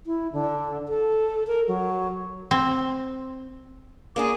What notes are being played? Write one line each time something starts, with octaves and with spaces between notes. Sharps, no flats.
E4
D3
A4
A#4
F#3
C4
A#3 D4 F4 G#4 D6